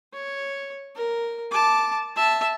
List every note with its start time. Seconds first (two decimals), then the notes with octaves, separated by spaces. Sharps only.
0.13 C#5
0.95 A#4
1.52 A5 D6
2.16 E5 A5